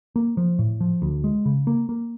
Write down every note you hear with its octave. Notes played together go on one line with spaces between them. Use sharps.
A#3
F3
A2
F3
D2
G#3
C#3
A#3
A#3